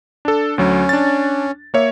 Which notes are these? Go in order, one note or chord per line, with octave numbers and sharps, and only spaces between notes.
D4 A4
D2 F#3 C#4
D4 A6
A#3 C#5 E5